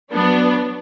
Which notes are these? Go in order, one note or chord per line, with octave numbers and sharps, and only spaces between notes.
F#3 B3 D4